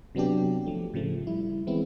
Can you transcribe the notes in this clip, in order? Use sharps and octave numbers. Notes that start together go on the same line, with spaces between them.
C3 F#3 B3 D4 G4
F3 A3
A2 C#3 F3 A3
G3 E4
E3 G#3 B3 C4 E4